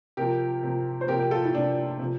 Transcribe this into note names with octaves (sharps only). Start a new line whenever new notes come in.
C3 F3 G4 A#4
C3 F3
C5
C3 F3 G4 A#4
G4 A#4
F4 A4
E4
C3 F3 D4
C3 F3